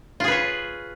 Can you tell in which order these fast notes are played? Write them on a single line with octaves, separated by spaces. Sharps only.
F4 G#4 B4 C#5